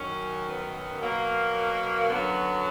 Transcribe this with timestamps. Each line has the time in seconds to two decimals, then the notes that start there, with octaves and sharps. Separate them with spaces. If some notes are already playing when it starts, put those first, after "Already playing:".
Already playing: F#2 D#3 F#3 C#4
0.47 B3
1.01 B2 F#3 A#3
2.10 F#2 D3 F#3 B3